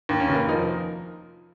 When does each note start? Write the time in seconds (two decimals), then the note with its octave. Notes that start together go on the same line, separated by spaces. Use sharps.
0.09 D#2
0.20 C#4
0.29 F1
0.35 A#3
0.49 F3 D#4